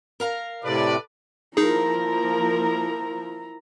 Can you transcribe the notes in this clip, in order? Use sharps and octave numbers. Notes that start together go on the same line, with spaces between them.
A#4 F5 A#5
A2 C3 A4 B4 D5
F3 A#3 D#4 E4 G#4 A#4 A#5